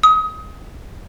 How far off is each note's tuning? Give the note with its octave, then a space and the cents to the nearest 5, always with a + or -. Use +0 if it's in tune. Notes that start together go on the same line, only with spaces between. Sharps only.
D#6 +25